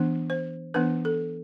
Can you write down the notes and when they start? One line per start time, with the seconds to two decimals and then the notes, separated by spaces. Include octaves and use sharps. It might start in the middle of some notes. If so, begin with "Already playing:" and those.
Already playing: E3 B3 D4
0.30 C5
0.74 E3 B3 D4 B4
1.05 A4